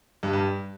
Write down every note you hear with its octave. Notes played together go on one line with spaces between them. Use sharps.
G2
G2